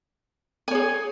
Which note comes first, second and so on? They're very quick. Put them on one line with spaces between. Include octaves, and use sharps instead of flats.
G#5 C#5 G#4